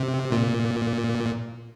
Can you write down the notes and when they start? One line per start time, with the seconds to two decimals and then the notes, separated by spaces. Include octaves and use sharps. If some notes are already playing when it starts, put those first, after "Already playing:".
Already playing: C3
0.32 A#2